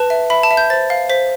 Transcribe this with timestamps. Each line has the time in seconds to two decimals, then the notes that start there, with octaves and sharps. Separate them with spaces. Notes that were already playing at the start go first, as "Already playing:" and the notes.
Already playing: B4 A5
0.10 E5
0.30 E5 B5
0.43 A5
0.51 E5
0.57 G6
0.70 C5 A6
0.90 F5
1.10 C5 B6